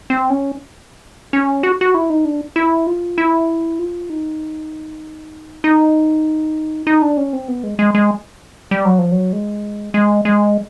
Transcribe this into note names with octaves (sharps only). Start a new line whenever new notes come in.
C4
C#4
C#4
F#4
F#4
E4
D#4
D4
E4
F4
E4
F4
D#4
D#4
D#4
D4
C#4
C4
B3
G#3
G#3
G#3
G3
F#3
F3
F#3
G#3
G#3
G#3